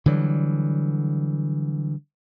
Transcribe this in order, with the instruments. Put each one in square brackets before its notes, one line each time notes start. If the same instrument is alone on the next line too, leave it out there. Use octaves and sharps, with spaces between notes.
[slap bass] D3 E3 F#3 G3